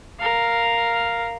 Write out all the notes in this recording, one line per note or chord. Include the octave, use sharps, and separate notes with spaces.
A#4 F5